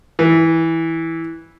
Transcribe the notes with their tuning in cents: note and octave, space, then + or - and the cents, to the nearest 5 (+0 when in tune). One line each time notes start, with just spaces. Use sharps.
E3 -10